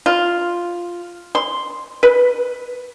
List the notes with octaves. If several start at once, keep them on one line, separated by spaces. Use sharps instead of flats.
F4
C6
B4